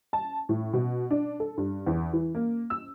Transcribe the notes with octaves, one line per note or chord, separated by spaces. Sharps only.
A5
A2
B2
D4
A4
G2
E2
E3
A#3
E6